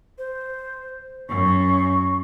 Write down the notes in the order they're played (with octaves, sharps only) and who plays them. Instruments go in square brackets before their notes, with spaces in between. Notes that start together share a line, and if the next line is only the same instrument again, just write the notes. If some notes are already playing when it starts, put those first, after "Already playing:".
[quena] C5
[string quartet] F#2 [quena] C#6